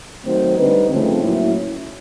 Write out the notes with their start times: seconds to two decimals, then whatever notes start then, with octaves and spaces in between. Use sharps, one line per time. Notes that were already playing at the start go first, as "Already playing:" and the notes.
0.24 D#3 F#3 A3 C4 D#4 C5
0.57 D3 G3 C4 D#4 B4
0.90 C#3 F3 A3 C4 D#4
1.22 A2 F#3 A#3 C#4 E4